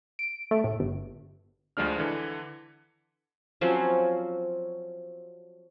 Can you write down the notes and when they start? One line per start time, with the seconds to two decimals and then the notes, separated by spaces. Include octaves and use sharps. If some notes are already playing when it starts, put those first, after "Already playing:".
0.19 D7
0.51 A3
0.64 A2
0.80 G1
1.77 D2 F3 G#3 D4 F6
1.98 D3 E3
3.61 F3 F#3 C4 C#4